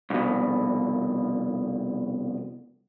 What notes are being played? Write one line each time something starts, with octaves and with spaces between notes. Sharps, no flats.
C2 F2 B2